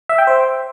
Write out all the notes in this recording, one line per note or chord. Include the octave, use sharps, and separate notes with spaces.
E5
G5
C5